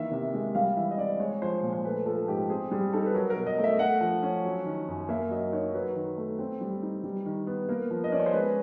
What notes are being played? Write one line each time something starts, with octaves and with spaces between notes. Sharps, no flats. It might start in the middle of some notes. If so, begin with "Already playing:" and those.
Already playing: D#3 E3 A#3 E5
C3
G#3
G3 F5
E3 E5
D#5
C4 D5
G#3 C#5
F3 C5
A#2
C5
A3 B4
F3 A4
G#2 G4
C4 G#4
G3 G#4
D#4 A4
B4
F#3 A#4
A#4
B2
D#5
A3
E5
A3 F#5
F3
C#4
F#3
D#3
F#2
A#3 E5
F#3 D#5
D#4 C#5
F#3 B4
D#3
A3
C4
G3
D#4
G3
D#3
B3
A#3 A#4
F3
D#5
C#4 D5
C#5
C5
G#3 B4